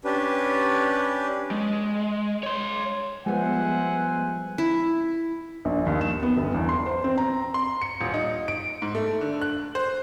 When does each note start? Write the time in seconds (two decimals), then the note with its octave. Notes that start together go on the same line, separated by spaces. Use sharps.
0.05 C#4 D4 G4 B4
1.51 G#3
2.43 C#5 C6
3.26 F3 G3 G#3 B3 C5 E5 F#5 G#5
4.58 E4
5.65 A#1
5.86 D#2
6.01 E7
6.23 B3
6.37 G1
6.54 E2
6.69 C6
6.86 C5
7.04 C4
7.18 A#5
7.54 C6
7.82 C#7
8.01 D#1
8.14 D#4
8.48 D7
8.82 G#2
8.95 A3
9.21 D3
9.41 F#6
9.75 C5